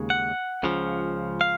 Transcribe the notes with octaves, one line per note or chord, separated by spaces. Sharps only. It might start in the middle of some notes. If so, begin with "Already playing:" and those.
Already playing: D#2 C#3 G#3
F#5
C#2 C#3 F3
F5